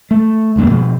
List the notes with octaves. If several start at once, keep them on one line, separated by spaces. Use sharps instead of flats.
A3
E1 C#2 G2 A#3
B2 F3